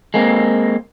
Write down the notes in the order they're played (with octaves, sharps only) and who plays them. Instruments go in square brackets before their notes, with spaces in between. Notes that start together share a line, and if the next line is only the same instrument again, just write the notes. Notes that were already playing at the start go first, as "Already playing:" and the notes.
[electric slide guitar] G#3 A#3 C4